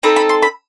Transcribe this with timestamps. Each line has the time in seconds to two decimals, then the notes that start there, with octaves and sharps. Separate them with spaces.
0.03 C4 D#4 A4 B5
0.16 B5
0.29 C6
0.42 B5